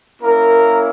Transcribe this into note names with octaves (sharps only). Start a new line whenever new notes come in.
A#3 C#4 E4 A#4